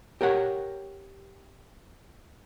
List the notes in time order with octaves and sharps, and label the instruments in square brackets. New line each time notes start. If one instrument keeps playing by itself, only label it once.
[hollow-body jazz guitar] G4 A#4 C#5 F#5